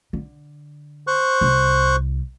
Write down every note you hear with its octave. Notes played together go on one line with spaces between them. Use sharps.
D3
C5 C#6 F#6
C2